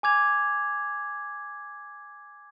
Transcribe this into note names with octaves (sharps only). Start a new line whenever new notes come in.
G#5 D6 G#6 F7